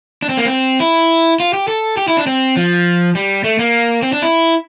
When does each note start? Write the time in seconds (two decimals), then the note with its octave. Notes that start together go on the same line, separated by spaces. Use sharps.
0.22 D4
0.29 C4
0.37 A#3
0.45 C4
0.80 E4
1.40 F4
1.53 G4
1.68 A4
1.97 G4
2.08 E4
2.17 D4
2.27 C4
2.57 F3
3.15 G3
3.44 A3
3.59 A#3
4.02 C4
4.13 D4
4.22 E4